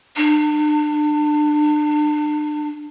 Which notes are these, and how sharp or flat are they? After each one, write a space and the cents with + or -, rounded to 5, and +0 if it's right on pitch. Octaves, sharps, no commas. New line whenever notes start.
D4 +35